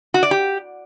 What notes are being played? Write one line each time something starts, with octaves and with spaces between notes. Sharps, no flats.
F#4
D5
G4